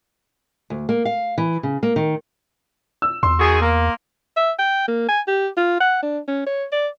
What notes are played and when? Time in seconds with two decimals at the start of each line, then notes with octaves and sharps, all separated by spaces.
0.70 D2
0.89 A#3
1.05 F5
1.38 E3
1.63 C#3
1.83 A#3
1.96 D#3
3.02 E6
3.23 E2 C6
3.40 D#3 F#4 G#4
3.61 A#3
4.36 E5
4.59 G5
4.88 A#3
5.09 G#5
5.28 G4
5.57 F4
5.80 F#5
6.03 D4
6.28 C#4
6.47 C#5
6.72 D5